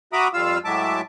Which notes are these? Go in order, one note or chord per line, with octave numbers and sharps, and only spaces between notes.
F#4 E5 A#5 B5 D6 D#6
F2 G3 F4 F5 E6
A2 F#3 G#3 E5 A5 D6